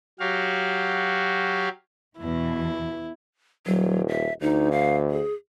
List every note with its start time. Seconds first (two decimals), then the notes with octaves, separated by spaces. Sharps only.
0.20 F#3 F#4 G4 F5
2.18 E2 B2 E3 E4
3.66 D#1 F#3
4.09 E5
4.41 D2 D#4
4.72 F5
5.11 G#4